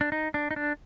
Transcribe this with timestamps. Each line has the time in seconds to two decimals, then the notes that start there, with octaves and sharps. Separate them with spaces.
0.01 D4
0.12 D#4
0.34 D4
0.51 D#4
0.56 D4